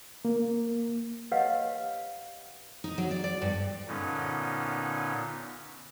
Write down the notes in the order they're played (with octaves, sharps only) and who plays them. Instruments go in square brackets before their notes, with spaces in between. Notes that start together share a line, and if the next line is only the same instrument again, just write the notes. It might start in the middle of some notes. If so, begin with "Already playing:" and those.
[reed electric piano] A#3
[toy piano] G4 B4 C#5 D#5 F5 F#5
[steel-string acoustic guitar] D#4
F#3
D5
D5
G2
[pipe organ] A#2 D3 B3 C#4 D#4